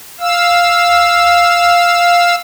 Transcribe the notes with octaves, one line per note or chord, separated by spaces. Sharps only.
F5 E6